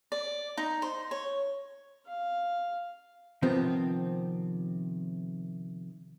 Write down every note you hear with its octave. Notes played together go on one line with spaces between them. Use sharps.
D5
D#4
C5
C#5
F5
C3 D#3 F3 B3 C4